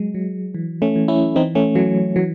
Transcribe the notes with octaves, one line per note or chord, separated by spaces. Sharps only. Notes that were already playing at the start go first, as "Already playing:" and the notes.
Already playing: F#3 G#3
F#3
E3
A3 C#4
E3
C#4 E4
E3 C4 D#4
A3 C#4
E3 F#3 A3
E3 F#3